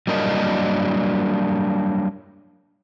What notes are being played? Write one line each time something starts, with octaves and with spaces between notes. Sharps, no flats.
F#3 G3 A#3 D4 A#4 D#5